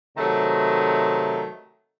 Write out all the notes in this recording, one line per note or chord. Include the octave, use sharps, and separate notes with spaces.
C3 D#3 F#3 A3